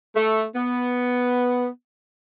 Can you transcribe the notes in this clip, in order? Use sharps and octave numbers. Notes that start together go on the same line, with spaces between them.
A3
B3